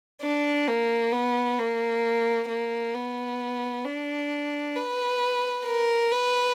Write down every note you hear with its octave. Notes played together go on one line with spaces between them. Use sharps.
D4
A#3
B3
A#3
A#3
B3
D4
B4
A#4
B4